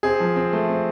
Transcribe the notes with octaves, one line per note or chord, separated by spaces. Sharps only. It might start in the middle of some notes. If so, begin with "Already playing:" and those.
C4 G#4
F3
C4
A3
C4